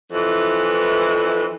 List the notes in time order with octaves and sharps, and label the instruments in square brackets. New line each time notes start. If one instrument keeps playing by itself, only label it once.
[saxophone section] F2 E3